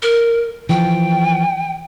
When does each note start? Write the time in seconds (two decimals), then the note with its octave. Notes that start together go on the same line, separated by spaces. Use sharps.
0.02 A#4
0.69 E3 F3 G5